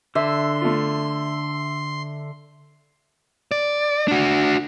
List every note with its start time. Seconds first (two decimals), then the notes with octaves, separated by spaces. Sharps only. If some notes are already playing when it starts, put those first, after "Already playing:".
0.15 D3 E5 C6
0.62 A3 F4
3.51 D5
4.08 D4 F#4